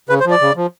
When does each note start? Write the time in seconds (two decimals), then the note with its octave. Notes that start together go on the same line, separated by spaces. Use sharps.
0.09 C#3 B4
0.20 C5
0.25 F3
0.31 D5
0.41 C#3
0.57 F3